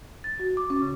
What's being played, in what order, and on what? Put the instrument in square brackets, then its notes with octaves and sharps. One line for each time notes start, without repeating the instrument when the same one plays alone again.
[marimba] A6
F#4
D6
C#4
C#3